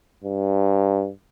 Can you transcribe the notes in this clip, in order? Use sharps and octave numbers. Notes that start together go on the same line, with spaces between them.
G2